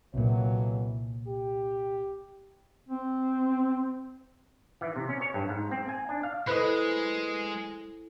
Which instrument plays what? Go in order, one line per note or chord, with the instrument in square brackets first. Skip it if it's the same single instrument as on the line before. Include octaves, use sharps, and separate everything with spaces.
[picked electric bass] C2 A#2 [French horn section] F2 E3 F#3
[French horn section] G4
[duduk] C4
[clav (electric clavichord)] E3
C3
C#4
C#5
G2
G#2
C4
G#5
D4
F5
[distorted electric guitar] G#3 [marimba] E4 A4 C5 [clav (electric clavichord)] B4 D#5